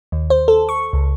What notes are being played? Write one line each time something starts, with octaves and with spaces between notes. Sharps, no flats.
D#2
C5
A4
C#6
C#2